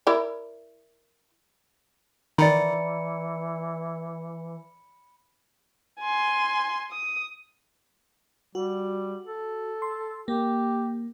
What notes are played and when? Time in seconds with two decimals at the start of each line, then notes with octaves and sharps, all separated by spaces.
0.07 E4 A#4 D5
2.38 D#3 E3 D5 A#5 B5 C#7
6.00 G#5 C6
6.91 D#6
8.55 G3 F#4
9.25 A4
9.82 C6
10.28 A#3 G4